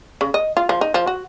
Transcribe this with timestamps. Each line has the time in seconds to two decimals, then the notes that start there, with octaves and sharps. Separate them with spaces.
0.21 C#3
0.34 D#5
0.57 F4
0.69 F3
0.81 D#4
0.94 F3
1.07 F#4